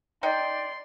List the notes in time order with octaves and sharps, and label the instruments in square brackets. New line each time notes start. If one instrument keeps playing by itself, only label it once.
[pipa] D#4 G5 [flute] D5 [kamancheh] C6